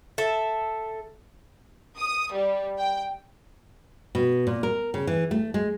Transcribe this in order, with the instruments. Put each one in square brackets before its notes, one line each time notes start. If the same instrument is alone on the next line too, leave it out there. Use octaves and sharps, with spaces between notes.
[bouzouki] A4 E5
[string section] D#6
G3
G5
[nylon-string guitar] B2
A#2
A#4
C#3
E3
A3
G#3